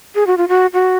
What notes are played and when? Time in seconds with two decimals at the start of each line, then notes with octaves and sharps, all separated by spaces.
0.15 G#4
0.27 F#4
0.38 F4
0.49 F#4
0.73 F#4